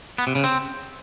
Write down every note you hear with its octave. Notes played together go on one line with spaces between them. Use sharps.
B3
C3
C#3
C4